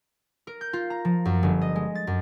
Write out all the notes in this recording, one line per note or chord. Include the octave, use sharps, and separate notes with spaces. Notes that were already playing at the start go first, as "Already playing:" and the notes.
A#4
G6
F4
A#5
F3
F#2
G1
D#5
G#3
A6
F#2